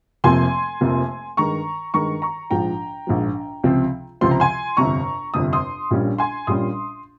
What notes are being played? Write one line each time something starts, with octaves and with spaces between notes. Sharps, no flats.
F1 F2 C3 F3 A#3 G#5 C6
F1 F2 C3 F3 A#3
G2 D#3 G#3 A#5 C#6
G2 D#3 G#3 A#5 C#6
A#5 C#6
A#1 G#2 F3 G5 A#5
A#1 G#2 F3
C#2 C3 F3 C4
C#2 C3 F3 C4 C6
A#5
G#5 C6
G1 F2 C3 A#5 C#6
G1 F2 C3 D#6
C6 D#6
A#1 A#2 G3 C#4
G#5 C6
A#1 A#2 G3 C#4 C6 D#6